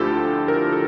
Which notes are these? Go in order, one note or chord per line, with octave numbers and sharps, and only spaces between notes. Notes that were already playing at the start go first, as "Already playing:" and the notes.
Already playing: D2 D3 F3 E4 F4 G4 A4
A#4
A4